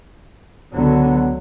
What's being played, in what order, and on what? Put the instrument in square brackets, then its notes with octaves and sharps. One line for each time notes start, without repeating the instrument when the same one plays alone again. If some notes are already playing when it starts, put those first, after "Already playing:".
[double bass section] C#2 D3 F#3 [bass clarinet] B3